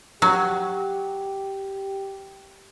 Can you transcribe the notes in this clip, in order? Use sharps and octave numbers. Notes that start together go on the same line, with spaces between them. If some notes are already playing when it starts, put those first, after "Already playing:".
F#3 G4